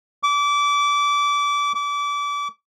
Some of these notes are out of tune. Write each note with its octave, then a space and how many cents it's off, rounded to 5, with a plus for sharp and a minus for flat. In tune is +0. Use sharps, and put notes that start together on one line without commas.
D6 -25
D6 -30